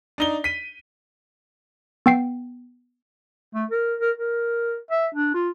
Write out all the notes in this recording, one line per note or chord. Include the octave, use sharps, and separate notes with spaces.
D4 D#4 G7
B6 D#7
B3 G5 C7
A3
A#4
A#4
A#4
E5
D4
F4